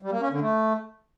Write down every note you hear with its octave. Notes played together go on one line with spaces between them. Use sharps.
G3
A#3
C#4
D3
A3